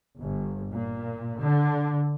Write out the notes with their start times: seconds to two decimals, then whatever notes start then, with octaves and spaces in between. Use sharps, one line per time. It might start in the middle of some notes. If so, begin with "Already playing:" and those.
0.18 G1
0.70 A#2
1.38 D3